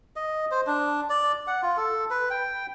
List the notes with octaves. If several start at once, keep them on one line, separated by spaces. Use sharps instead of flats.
D#5
C5
D4
D5
F#5
F4
A4
B4
G5